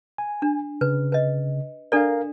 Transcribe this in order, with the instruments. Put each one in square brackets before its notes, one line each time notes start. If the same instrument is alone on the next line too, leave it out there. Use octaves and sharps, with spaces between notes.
[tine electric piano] G#5
[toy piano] D4
[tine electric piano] C#3 [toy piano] B4
[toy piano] B4 D#5
[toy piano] D4 A4 D5 [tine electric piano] A#4 F5